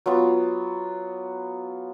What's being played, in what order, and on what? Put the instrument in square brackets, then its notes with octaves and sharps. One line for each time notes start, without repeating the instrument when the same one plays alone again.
[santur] F#3 B3 F4